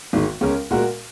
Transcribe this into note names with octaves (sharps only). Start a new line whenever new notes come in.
G#1 G#2 D#3 G#3
C#2 C#3 G#3 C#4 A#4
A#2 G#3 F#4 A#4